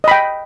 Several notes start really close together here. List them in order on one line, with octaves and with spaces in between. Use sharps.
D#5 B5 G5